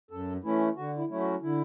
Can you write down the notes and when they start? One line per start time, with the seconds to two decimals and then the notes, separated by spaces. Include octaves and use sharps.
0.11 F#2 A4
0.43 E3 A3 C#4 E4
0.76 D3 F#4
0.97 E4
1.09 F#3 A3 C#4 E4
1.20 F#4
1.42 D3 E4